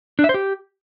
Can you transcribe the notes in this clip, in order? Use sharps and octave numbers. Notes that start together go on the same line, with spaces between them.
D4
E5
C5
G4